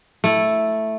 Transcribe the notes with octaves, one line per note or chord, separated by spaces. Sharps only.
A3 E4